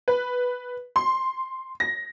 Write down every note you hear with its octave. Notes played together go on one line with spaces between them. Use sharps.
B4
C6
A#6